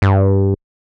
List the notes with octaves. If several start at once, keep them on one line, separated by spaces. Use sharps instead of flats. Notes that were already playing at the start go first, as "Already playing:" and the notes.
G2